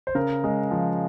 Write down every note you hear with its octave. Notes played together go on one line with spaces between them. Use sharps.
C5
C#3 A#4
G#3
F3